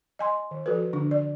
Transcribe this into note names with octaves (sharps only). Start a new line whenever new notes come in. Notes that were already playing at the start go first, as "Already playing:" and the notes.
D#5 G#5 C6
D#3
F3 F#4 A4 B4
D3 D4
D5